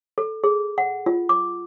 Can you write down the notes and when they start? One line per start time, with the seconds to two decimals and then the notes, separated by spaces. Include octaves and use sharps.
0.18 A4
0.44 G#4
0.78 F#5
1.06 F4
1.29 D6